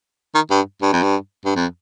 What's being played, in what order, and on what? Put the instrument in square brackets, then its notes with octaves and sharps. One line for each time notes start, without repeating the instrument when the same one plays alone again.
[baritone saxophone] D#3
G2
G2
F2
G2
G2
F2